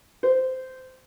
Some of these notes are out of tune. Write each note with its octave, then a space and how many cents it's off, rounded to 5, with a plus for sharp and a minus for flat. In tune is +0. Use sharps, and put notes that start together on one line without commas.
C5 -15